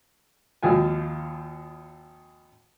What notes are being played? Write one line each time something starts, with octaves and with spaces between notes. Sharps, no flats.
G#1 D#2 F3 G#5